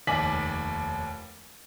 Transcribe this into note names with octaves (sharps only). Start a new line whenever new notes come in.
F1 D#2 G#5 D6 B6 F#7